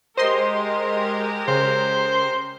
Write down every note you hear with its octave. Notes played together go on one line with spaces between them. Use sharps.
G#3 G4 A#4 C5 D#5 C6
C#3 C5